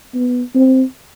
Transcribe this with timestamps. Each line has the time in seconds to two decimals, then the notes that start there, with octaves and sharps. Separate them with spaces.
0.15 B3
0.55 C4